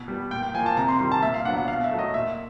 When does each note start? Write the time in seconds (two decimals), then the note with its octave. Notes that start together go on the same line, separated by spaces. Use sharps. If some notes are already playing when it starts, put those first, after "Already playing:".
Already playing: B2
0.08 G3 B3
0.31 A#2 G5
0.43 G5
0.54 F3 G#5
0.58 A#3
0.66 A5
0.77 C3 A#5
0.88 C6
0.99 D#3 G3 C6
1.12 A5
1.22 A#2 E5
1.34 F5
1.45 F#3 B3 D4 F#5
1.57 F#5
1.68 B2 F5
1.84 E5
1.91 F#3 A3
1.99 D#5
2.14 A#2 E5